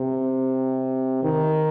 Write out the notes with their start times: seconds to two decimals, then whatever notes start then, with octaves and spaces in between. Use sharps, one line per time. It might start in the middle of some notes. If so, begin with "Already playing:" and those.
Already playing: C3
1.23 D#3